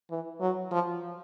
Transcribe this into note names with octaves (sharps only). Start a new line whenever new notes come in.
E3
F#3
F3